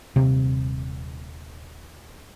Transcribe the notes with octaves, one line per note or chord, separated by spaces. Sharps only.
D#1 C3 A#3